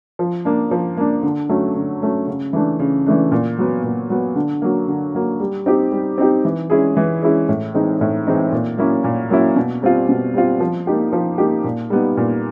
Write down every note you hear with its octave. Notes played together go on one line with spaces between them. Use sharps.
F3
A#3 D4
F3
A#3 D4
D3
F#3 A3 C#4
D3
F#3 A3 C#4
C#3
E3 A3 D4
C#3
E3 A3 D4
A#2
F#3 B3
A#2
F#3 B3
D3
F#3 A#3
D3
F#3 A#3
G3
C4 D#4 G4
G3
C4 D#4 G4
E3
G#3 C#4 E4 G#4
E3
G#3 C#4 E4 G#4
A2
E3 G#3 C4 D#4
A2
E3 G#3 C4 D#4
A#2
F#3 A#3 C#4 E4
A#2
F#3 A#3 C#4 E4
B2
G3 C4 F4
B2
G3 C4 F4
F3
A#3 D#4 G4
F3
A#3 D#4 G4
A#2
G3 B3 D#4
A#2